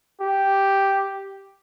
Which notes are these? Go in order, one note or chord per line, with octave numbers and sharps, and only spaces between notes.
G4